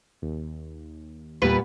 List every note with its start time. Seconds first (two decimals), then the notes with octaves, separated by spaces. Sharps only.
0.22 D#2
1.42 E2 A#2 G3 B3 B4